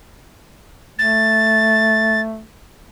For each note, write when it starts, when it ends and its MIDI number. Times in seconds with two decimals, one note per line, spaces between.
0.99 2.43 57
0.99 2.21 93